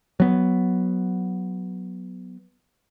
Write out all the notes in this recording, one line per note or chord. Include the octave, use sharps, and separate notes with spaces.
F#3 B3